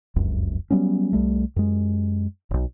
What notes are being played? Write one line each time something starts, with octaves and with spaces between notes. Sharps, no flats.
F1 C#2 F#2
F#3 G3 B3 C#4
C2 G3 A3
F#2 G#3
E1 B1